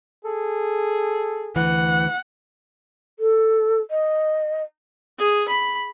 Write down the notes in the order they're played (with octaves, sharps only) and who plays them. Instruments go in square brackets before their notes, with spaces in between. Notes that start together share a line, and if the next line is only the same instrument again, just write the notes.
[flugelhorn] G#4 [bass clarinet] A4
[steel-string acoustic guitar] D2 E3 [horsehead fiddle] F#5
[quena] A4
D#5
[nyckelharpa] G#4
B5